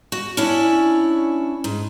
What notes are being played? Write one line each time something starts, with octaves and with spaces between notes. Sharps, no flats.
F#4
C#4 D4 E4 C#5
G#2